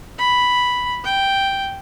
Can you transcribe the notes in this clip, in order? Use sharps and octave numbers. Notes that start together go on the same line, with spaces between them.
B5
G5